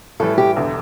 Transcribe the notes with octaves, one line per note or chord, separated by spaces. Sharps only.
A2 E3 G3 A4
G4
E1 E2 D3